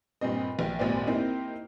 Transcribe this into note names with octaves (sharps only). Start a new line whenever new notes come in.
G2 A#2 C4 D#5
A#1 G5
G#1 D#2 A#2 C5 D5
A#3 C4 D#4 E4 G4